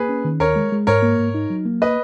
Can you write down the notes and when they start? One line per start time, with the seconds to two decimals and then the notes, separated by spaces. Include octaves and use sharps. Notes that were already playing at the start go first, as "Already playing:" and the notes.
Already playing: A#3 G#4 B4
0.09 C#4
0.25 D#3
0.40 D#2 A#4 C#5
0.56 G#3
0.72 G#3
0.87 G#2 A#4 C#5
1.02 A#3
1.19 G#2
1.35 D#4
1.50 F#3
1.66 A#3
1.82 B4 D#5